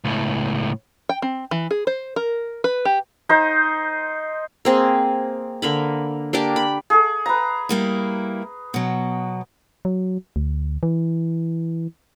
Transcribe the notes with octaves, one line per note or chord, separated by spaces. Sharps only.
C#2 A2
G5
C4
E3
G#4
C5
A#4
B4
G4
D#4 C5
A#3 C4 G#4
D3 A#3 B5
A#3 D4 G4 D6
B5
G#4 A4
B4 A#5
G3 A#3 E4
B2 F#3
F#3
D2
E3